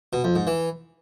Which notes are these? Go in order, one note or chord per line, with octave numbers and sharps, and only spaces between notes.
B2
F2
G#2
E3